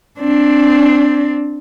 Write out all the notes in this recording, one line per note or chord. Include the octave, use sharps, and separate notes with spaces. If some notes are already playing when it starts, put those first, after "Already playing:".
C4 D4